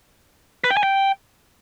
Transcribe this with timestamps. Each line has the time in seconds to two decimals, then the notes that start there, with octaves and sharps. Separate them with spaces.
0.64 B4
0.70 G5
0.77 G#5
0.83 G5